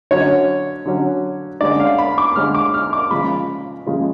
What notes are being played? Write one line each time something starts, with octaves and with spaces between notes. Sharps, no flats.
D3 F#3 C#4 C#5
D3 F#3 C#4
D3 G#3 C#4 D5
F5
B5
D6
D3 G#3 C#4 F6
D6
F6
D6
C#3 F3 G#3 B5
C#3 F3 G#3